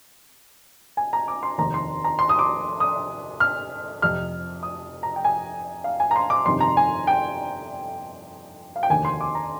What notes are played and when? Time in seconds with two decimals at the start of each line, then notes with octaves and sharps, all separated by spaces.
0.97 G#5
1.13 A#5
1.28 D6
1.43 C6
1.58 F1 D#2 D#3 A#5
1.74 C6
2.04 A#5
2.19 C6
2.29 D#6
2.39 D6
2.80 D#6
3.40 F6
4.02 F1 F2 C3 F6
4.63 D#6
5.03 A#5
5.16 G5
5.25 G#5
5.84 F5
6.00 G#5
6.11 A#5
6.16 C6
6.30 D6
6.45 G1 F2 C3 D#3 C6
6.60 A#5
6.77 G#5
7.07 G5
8.76 F5
8.83 G5
8.90 F1 D#2 D3 G#5
9.05 C6
9.21 D6
9.35 A#5